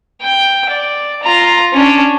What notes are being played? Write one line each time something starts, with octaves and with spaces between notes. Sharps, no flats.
G5
D5
F4 A#5
C#4 D4